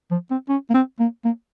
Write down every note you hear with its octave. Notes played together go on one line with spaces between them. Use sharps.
F3
C4
C#4
A#3
C4
A#3
A#3